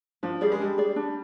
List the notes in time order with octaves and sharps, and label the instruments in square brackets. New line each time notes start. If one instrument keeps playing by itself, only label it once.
[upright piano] F3 [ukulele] D4
[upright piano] G3 [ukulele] G#4 D5
[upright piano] G#3
[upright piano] G3 [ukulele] D4
[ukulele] G#4 D5
D4